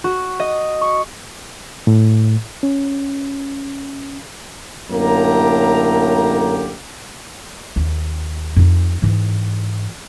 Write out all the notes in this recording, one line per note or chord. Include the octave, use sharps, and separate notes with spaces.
F#4
D#5
C#6
A2
C#4
F#2 A2 D3 A#3 G4 A#5
D#2
F2 D#4
G#2 E3